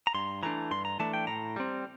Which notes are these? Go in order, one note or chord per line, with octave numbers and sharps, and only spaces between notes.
A#5
G2 C6
E3 A3 D4 A#5
G2 C6
A#5
E3 A3 D4 A5
G5
A2 A#5
G3 C4